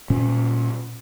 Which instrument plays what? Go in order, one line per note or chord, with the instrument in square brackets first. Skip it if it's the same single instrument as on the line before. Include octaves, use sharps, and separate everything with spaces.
[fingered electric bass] A#2 C#4